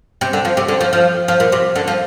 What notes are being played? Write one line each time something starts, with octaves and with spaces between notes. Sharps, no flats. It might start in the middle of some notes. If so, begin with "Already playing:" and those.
C3
D3
F3
C3
D3
F3
F3
F3
A#2
C3
D3
F3